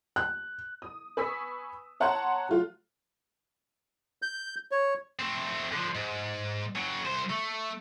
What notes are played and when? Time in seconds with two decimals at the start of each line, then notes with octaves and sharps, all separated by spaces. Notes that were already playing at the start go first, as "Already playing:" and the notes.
0.16 F#6
0.82 D#6
1.17 B4 G#5 C#6 D#6 E6 B6
2.00 C#5 F#5 A5 A#5 C6 F#6
2.49 F#3 A3 F4
4.22 G6
4.71 C#5
5.19 A3 C4
5.72 D3 F3
5.95 G#2
6.75 C#3 F#3
7.05 C2 C5
7.30 A3